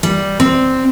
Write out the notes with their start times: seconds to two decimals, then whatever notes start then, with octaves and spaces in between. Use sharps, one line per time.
0.03 G3
0.40 C4